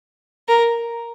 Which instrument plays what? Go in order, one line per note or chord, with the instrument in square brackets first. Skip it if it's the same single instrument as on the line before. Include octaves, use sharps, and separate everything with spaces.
[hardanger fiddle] A#4